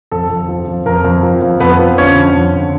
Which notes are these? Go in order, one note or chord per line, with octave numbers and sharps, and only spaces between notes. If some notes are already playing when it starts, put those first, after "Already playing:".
F2 A4
F2
F3
F2
F2 A#4
F2
F3
F2
F2 B3 B4
F3
D3 C#4 C#5
F2
F2
D3